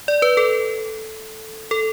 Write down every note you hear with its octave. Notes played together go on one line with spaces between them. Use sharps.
D5
B4
A4
A4